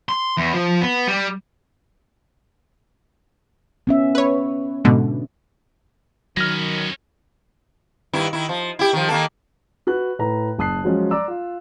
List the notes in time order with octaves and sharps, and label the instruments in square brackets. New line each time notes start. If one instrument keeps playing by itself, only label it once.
[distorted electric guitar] C6
E2
F3
B3
G3
[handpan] B3 C#4 E5
[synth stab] B4 C#5
G#2 B2 D3
[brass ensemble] D#3 [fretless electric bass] F#3 [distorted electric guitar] B3 C#4 [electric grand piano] F6 A#6
[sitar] G2 D#3 E4
D#3 E4
F3
E4 G4
D#3 F3
D#3 A#3 A4
[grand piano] F#4 B4 F#6
A2 B4 A#5
F#1 A5 D#6 F#6 C7
F3 F#3 G#3 C#4
D5 A#5 D6 E6
F4